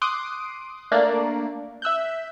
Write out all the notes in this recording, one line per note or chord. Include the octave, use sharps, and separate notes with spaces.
C6 D6 D#6 F#6 C7 D7
A3 A#3 D4 D5
E5 E6 F#6 G6